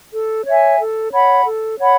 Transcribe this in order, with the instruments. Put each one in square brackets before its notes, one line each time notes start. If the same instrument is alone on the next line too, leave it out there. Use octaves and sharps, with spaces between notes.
[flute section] A4
C#5 E5 G#5
A4
C#5 F#5 B5
A4
C#5 F#5 B5